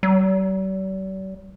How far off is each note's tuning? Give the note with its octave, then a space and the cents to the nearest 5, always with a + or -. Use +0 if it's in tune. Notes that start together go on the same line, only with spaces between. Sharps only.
G3 -45